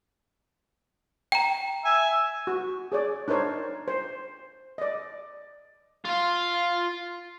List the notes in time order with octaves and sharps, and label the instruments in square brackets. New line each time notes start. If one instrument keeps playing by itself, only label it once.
[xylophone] G5 A#5
[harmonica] E5 G#5
[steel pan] F#4
G#4 C#5 D5
D4 D#4 A#4 C5 C#5
C5
D5 D#5
[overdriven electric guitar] F4 F5